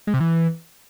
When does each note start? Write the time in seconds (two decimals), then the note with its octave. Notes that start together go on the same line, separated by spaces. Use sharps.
0.07 G#3
0.14 C3
0.20 E3